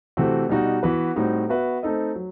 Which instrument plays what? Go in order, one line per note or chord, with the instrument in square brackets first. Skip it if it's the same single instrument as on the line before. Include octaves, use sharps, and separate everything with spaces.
[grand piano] C3 E3 A3 C4 F#4
B2 G3 D#4 F#4
E3 B3 F#4 B4
A2 G3 C4 D#4 F#4
B3 F#4 B4 E5
A3 C4 D#4 A4 D#5
F#3